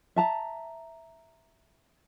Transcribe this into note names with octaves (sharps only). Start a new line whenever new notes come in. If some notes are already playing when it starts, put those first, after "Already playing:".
E5 A5 A#5